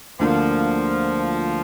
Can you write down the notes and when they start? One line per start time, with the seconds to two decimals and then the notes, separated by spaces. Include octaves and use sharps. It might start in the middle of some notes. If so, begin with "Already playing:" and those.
0.19 D2 D3 F3 A#3 D4